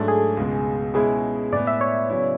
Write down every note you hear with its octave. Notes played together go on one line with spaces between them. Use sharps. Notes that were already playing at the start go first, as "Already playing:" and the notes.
Already playing: G#2 F#3 A3 D4 A4
G#4
C#2 B2 G#3
B2 G#3 C#4 E4 G#4
A2 G#3 B3 D5
E5
C#5
C#3 F#3 B3 E4